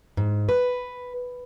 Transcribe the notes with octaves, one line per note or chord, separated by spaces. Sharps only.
G#2
B4